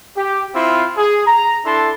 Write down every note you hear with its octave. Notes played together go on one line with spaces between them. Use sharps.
G4
C4 E4 F4
G#4
A#5
D4 E4 A4 A5 C6